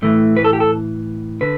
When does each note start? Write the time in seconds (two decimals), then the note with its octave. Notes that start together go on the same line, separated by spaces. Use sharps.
0.02 A2 E3 A3
0.37 B4
0.44 A4
0.53 G4
0.60 A4
1.41 D3 B4